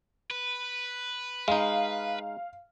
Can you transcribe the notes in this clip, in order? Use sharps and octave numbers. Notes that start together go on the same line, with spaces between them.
B4
G#3 D#4 F5